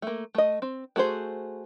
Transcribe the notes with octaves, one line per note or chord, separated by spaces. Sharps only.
A3 A#3
A3 D#5
C4
A3 F#4 G#4 C5